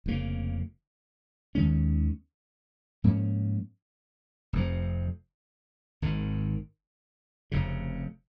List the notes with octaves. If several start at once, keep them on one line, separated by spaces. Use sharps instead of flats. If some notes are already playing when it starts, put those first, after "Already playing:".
F1 F2 C#3 A#3
D#2 D#3 G#3 C#4
G#2 F3 A#3 C#4
F1 F2 F3
G#1 G#2 D#3
F1 F2 C#3